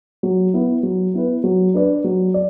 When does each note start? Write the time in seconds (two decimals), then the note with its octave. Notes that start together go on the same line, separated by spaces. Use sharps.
0.23 F#3
0.54 B3 E4 B4
0.83 F#3
1.14 B3 E4 B4
1.44 F#3
1.74 D4 B4 D5
2.04 F#3
2.34 D5